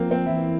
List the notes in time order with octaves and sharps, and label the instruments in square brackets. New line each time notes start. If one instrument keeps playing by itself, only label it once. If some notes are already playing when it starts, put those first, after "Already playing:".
Already playing: [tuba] F3 [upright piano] A#3 C4
[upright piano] C4
[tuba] E3 [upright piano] E4